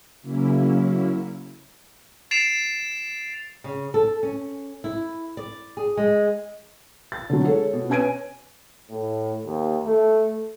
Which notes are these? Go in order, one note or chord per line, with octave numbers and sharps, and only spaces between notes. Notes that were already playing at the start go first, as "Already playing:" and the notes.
C#3 F#3 A#3 C#4 E4
A6 C7 D7 E7 F7
C#3
A4
C#4
E4
D5
G#4
G#3
A6
D3 F#3
G#3 A4 C#5
B2
C#4 B4 G#5 G#6 D7 D#7
A2
D#2
A3